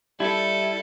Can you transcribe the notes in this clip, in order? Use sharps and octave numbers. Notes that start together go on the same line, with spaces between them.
G3 E4 A4